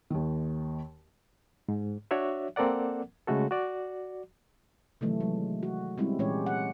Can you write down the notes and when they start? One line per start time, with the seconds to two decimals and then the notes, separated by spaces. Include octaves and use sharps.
0.10 D#2 D#3
1.69 G#2
2.11 D4 F#4 C#5 D5 E5
2.56 A#3 C4 A4 A#4 D5 F#5
3.27 C#3 G#3 A3 F#4 A4
3.51 F#4 D5
5.01 C3 D#3 E3 F#3 A3
5.20 F#3 G#3
5.63 F#4
5.98 G3 G#3 C4 C#4 E4
6.19 A#2 E3 G#3 C#4 G4 C#5
6.46 F#5